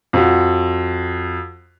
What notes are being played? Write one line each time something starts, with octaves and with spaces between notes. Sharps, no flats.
F2 F#4